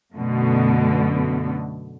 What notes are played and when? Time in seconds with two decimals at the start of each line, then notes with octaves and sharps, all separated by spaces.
0.16 F#2 B2 D3 A3